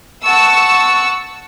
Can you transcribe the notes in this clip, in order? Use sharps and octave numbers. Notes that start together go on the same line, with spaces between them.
F#5 A5 C#6 E6